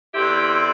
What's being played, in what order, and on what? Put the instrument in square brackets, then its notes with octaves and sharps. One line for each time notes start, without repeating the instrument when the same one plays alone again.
[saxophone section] E2 D3 C4 E4 G4